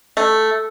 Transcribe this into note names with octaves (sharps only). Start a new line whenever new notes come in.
A3